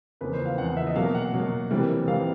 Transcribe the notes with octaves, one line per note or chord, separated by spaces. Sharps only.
E2 C#3 F3 A#3 B4
C5
F5
E2 C#3 F3 A#3 F#5
E5
D#5
B2 F#3 A#3 F5
F#5
B2 F#3 A#3
C3 E3 G3 A#3
C3 E3 G3 A#3 F5